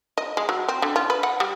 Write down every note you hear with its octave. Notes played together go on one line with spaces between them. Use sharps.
D#5
G#3
F#3
C4
D3
F4
B4
F#5
G3